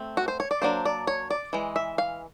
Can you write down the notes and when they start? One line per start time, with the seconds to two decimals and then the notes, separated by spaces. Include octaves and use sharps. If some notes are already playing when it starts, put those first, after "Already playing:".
Already playing: A3 C4
0.17 F#4
0.28 C5
0.40 C#5
0.51 D5
0.62 F#3 A#3 D4 C5
0.85 D5
1.07 C#5
1.30 D5
1.53 E3 G#3
1.76 E5
1.98 F5